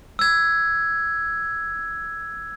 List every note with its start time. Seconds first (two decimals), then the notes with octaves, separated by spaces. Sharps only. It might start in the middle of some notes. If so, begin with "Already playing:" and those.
0.19 E6 G#6